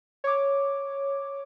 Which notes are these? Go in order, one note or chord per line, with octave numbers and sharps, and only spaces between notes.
C#5 D6